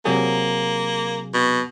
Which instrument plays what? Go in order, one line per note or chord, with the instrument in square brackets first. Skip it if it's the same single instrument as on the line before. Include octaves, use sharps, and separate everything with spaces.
[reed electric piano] C3 F#3 G#4 [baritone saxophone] A#3
[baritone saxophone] B2